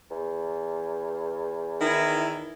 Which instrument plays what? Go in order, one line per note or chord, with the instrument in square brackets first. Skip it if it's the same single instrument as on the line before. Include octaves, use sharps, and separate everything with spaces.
[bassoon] E2
[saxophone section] D#3 E4